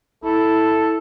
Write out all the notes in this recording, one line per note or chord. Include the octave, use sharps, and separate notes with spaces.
E4 A4